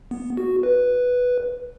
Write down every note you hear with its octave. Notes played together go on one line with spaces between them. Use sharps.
B3
F#4
B4